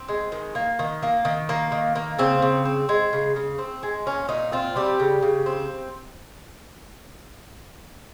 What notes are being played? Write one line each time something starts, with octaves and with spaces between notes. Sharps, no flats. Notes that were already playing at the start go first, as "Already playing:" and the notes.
Already playing: C4
G#3
D#3
A#3
D#3
A#3
D#3
A#3
D#3
A#3
C#3 C4
C#3
C4
G#3
C#3
C#3
C4
G#3
A#2 C#4
A#2 D#4
C4 F4
G3 G4
C#3
C#3
C4